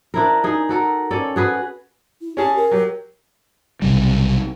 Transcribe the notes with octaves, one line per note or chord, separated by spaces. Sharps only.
D4 E4 A#4
D#4 G#4
F#4 A4 A#4
C#4 A4 D5
F#4 G#4 B4
E4
C#4 G4 G#4 A5
A#4
F#3 G4
B1 C3 G3